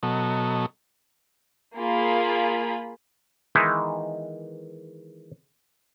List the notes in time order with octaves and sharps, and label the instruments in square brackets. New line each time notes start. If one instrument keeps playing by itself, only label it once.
[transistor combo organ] B2 F#3 A4 D#5
[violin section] A#3 F4 G#4 B5
[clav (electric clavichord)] D#3 E3 G#3 B3 D#4 E4